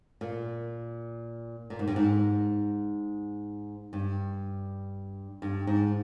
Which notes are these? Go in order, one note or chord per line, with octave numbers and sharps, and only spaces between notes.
A#2
A#2
G#2
G2
G#2
G2
G2
G#2